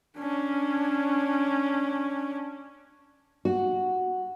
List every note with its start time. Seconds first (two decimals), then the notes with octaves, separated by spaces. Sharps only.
0.18 C#4 D4
3.45 F#4